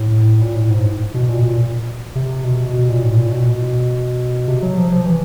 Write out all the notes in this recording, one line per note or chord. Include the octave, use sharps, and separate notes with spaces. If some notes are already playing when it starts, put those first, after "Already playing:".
Already playing: A2
A#2
A2
G#2
B2
A#2
A#2
C3
B2
B2
A#2
A2
A#2
B2
C3
F#3
F3
F3
E3